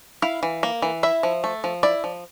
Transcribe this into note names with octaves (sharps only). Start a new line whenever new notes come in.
E4 F5
E3
A#3
E3
E4 E5
F3
A3
F3
E4 D5
F3